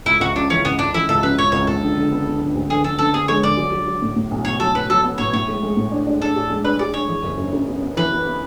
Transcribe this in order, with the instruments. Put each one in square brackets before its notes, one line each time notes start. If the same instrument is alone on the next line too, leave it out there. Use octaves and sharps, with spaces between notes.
[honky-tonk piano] C#2 [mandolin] E4
[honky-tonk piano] C#2 [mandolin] F#4
[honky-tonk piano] C#3 [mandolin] D4
[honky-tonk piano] E3 [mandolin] C#4
[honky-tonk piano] C#2 [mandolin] B3
[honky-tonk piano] C#2 [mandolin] D4
[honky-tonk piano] E3 [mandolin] E4
[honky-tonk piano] C#2 [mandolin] A4
[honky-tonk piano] C#3 [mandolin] B4
[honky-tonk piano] C#2 [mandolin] C#5
[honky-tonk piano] C#2 [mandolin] C#5
[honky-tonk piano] C#2 [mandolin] A4
[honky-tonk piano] D3
D3
B3
B3
D3
D2
[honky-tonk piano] D3 [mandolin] G#4
[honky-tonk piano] D3 [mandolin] A4
[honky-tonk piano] D3 [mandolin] A4
[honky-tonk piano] B3 [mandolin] G#4
[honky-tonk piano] G#3 [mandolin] C#5
[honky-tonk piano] D3 [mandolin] D5
[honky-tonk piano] F#3
F#3
F#3
A2
A2
B1
[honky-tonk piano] B1 [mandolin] C#5
[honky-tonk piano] F#3 [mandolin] A4
[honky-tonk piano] B1 [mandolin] B4
[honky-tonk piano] F#3 [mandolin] A4
[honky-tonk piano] B3
[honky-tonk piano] A2 [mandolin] C#5
[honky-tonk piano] A2 [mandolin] C#5
[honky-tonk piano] G#3
G#3
A2
D4
D4
[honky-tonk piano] D4 [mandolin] A4
[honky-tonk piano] G#4
G#3
[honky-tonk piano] D4 [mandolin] B4
[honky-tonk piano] G#4 [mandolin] D5
[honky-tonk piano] D4 [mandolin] C#5
[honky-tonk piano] E3
F#1
F#2
F#2
B3
B3
[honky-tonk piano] E3 [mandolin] B4
[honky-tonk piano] B3
B3